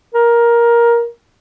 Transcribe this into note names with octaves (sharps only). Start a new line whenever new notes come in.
A#4